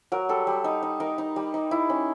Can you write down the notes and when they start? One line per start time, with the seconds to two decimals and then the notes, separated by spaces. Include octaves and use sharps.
0.12 F#3 A#4
0.29 G3 A4
0.47 G3
0.64 D#4
0.83 D#4
1.00 D#4 A#4
1.18 D#4
1.36 G3
1.54 D#4
1.71 E4
1.90 C#4